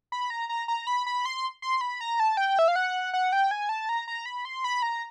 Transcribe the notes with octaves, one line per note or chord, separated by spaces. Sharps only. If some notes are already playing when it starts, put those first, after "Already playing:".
B5
A#5
A#5
A#5
B5
B5
C6
C6
B5
A#5
A5
G5
E5
F5
F#5
F#5
G5
G#5
A5
A#5
A#5
B5
C6
B5
A#5